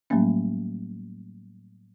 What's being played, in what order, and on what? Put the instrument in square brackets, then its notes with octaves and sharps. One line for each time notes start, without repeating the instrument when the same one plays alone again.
[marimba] A2 F#3 G3 A3 A#3 C#4